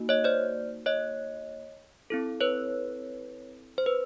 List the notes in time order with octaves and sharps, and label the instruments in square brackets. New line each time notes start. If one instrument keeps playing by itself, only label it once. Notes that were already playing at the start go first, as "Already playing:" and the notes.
Already playing: [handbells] A#3 D#4 F#4
C#5 D#5
C5 D5
C#5 D#5
C4 E4 A4
B4 C#5
C5
B4